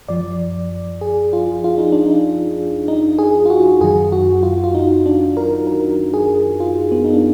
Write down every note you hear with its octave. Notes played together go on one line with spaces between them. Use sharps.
F#2 F3 D5
G#4
F4
F4
D#4
D4
D#4
D#4
G#4
F4
F#4
F#2 D#3 F#3 G#4
F#4
F4
F4
D#4
D4
A#4
A#4
G#4
F4
B3
D#4
D4